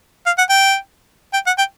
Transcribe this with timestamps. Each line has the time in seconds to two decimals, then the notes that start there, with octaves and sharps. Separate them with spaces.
0.26 F5
0.38 F#5
0.50 G5
1.34 G5
1.47 F#5
1.58 G5